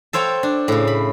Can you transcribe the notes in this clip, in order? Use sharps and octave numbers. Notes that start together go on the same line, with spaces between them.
A4 C5 C#5 F5 G5
D4
A2 C#3
B5